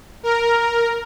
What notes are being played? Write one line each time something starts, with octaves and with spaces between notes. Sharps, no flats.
A#4